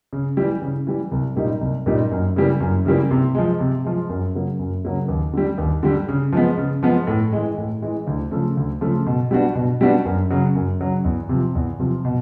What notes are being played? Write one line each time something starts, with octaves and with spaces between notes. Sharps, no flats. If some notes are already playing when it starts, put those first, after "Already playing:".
C#3
E3 G3
C#3
E3 G3
C2
A#2 G3 A#3 D#4
C2
A#2 G3 A#3 D#4
F#2
C#3 E3 G3 A#3
F#2
C#3 E3 G3 A#3
C3
F3 G#3
C3
F3 G#3
F#2
C#3 F#3 A#3
F#2
C#3 F#3 A#3
D#2
D3 G3
D#2
D3 G3
C#3
F3 G#3 B3
C#3
F3 G#3 B3
A2
E3 G#3
A2
E3 G#3
D2
C#3 F3 A3
D2
C#3 F3 A3
B2
G3 B3 D4 F#4
B2
G3 B3 D4 F#4
F#2
C#3 F#3
F#2
C#3 F#3
E2
C3 F3
E2
C3 F3
B2